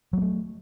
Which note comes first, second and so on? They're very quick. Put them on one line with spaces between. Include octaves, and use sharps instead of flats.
F#3 A#3 A3